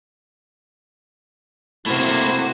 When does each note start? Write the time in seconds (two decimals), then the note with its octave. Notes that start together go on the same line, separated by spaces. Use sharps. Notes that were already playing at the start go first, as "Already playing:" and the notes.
1.86 C3 A3 A#3 E4 F#4 C5